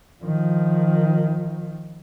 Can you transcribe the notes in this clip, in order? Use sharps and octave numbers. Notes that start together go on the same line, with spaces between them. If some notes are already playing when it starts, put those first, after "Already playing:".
D#3 F3